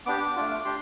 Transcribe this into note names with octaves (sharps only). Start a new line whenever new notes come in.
B3 D4 G4 D6
A3 D4 F4
D4 G4 C6